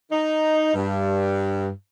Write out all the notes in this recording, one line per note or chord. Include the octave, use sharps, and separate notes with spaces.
D#4
G2